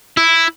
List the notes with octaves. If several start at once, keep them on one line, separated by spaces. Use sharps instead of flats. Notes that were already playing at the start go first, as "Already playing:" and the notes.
E4